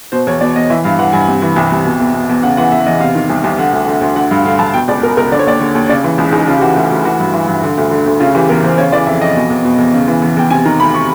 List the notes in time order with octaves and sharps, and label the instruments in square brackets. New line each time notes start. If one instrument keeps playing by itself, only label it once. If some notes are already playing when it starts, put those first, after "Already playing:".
[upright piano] B2 C5
E2 C#5
B2 D5
E2 D#5
E3 E5
G2 F5
E3 F#5
G2 G#5
C3
E3
C2
C2
B2
E2
B2
E2
C#3 F#5
E3 F#5
E2 E5
E2 D#5
C3 F5
D#3
C2
C2
D3 F#5
D2
D3
D2
D3 F#5
G2 F5
D3 F5
G2 A5
B2 G5
C#2 D5
B2 A#4
C#2 A#4
D3 D5
C#5
D#2 D5
D3
D#2
C#3 D5
E3
C#2 G#4
C#2 D#4
C#3 F4
G4
E3 F#4
D2 F#4
D2
E3 F#4
G2
E3
G2
D3
D2
D3
D2
C#3 F4
E3 G4
E2 A#4
E2 C5
C#3 C#5
E3 D5
F2 E5
F2 D#5
B2
E2
B2
E2
C#3
E3
E2
E2 G5
C3 G#5
D#3 A#5
D2 B5
C#6